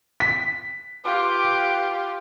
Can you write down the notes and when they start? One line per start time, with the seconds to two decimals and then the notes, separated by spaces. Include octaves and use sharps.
0.20 B6
1.04 F4 G4 B4 D6